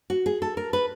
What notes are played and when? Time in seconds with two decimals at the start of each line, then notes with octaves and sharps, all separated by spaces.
0.10 F#4
0.26 G#4
0.42 A4
0.57 A#4
0.73 B4